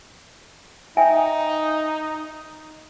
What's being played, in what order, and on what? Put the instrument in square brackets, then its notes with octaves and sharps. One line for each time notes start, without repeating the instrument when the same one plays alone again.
[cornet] D#4 [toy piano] E5 G5 G#5